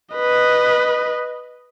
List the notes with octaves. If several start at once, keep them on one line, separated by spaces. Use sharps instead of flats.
B4 D#5